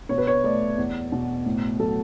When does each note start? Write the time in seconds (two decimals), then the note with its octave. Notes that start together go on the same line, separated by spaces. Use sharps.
0.09 B2 C#5
0.18 B4
0.27 C#5
0.44 A3 D5
0.78 E2
1.12 B2
1.46 A2
1.79 F#3 A4